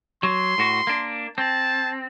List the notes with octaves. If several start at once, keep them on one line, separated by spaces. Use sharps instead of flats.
F#3 C6
A2 F#4
A#3 D4
C4 A5